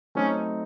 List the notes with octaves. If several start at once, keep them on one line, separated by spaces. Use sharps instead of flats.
F#3 A3 C4 C#4 D#4